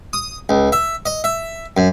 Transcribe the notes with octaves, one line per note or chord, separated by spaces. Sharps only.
D#6
C#2
E5
D#5
E5
F#2